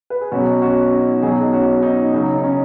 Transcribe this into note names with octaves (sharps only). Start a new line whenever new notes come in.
B4
G#4
B2 F#3 C#4 F#4
C#4 F#4
D#4
B2 F#3 D#4 G#4
C#4 F#4
D#4
C#3 F#3 D#4
D#4
C#4